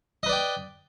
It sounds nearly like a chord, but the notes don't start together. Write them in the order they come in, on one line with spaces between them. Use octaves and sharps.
D#5 B4 D5 G5